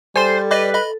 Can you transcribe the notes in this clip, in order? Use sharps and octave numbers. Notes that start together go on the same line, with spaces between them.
G3 A4 C5 G#5 C6
B4 D5 D#5 D6
D#5 B5